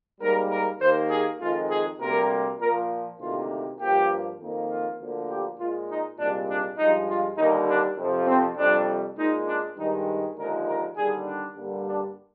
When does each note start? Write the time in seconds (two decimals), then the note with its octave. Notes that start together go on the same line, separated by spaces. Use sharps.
0.21 G#2 G3 A#3 A#4
0.50 A#4
0.80 D#2 D#3 A#3 C5
1.10 G#4
1.40 F2 D#3 G#3 F4
1.69 G#4
1.99 D2 C3 G3 A#3 A#4
2.59 A#2 F3 A#3 A#4
3.19 D2 C3 D#3 A#3 F4
3.79 G2 F3 A#3 G4
4.40 F2 D#3 A#3
4.69 F4
4.99 D2 D3 F3 A#3
5.28 G4
5.59 A#2 G#3 F4
5.88 D#4
6.18 C2 A#2 G#3 D4
6.48 D4
6.77 G2 F3 G#3 D#4
7.07 F4
7.37 D#2 D3 G3 A#3 D#4
7.68 D4
7.98 F2 C3 F3
8.27 C4
8.57 F2 C3 G3 D4
9.17 A#2 G#3 D#4
9.46 D4
9.76 G2 D#3 G#3 D#4
10.36 D#2 D3 F3 G#3 A#4
10.66 A#4
10.96 D#2 D3 G3 G#4
11.26 D4
11.56 G2 D3 G3 A#3
11.86 D4